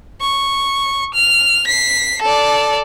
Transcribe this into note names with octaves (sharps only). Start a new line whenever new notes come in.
C#6
F6
B6 C7
A4 D5